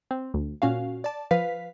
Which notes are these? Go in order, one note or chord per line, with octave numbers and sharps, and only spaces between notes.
C4
D2
A#2 C#4 F#4 F5
D5 A5
F3 B4 F5 B6